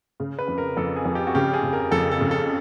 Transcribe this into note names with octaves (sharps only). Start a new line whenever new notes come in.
C#3
B4
F2
A#4
F2 A4
G#4
F2
G4
F#4
C#3 G4
G#4
C#3
A#4
F2 A4
A4
C#3
A4